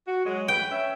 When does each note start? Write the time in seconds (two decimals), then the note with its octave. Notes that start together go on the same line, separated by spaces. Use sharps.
0.06 F#4
0.25 F#3 G#3
0.48 B4 G5
0.70 C#4 E5